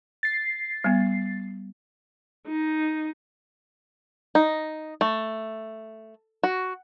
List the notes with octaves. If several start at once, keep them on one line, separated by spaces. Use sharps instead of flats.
A6 C7
G3 B3
D#4
D#4
A3
F#4